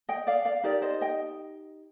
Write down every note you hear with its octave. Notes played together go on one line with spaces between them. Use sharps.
D#5 G5
D5 F5
D5 F5
D#4 G4 A#4 D5
C5 D#5
D#5 G5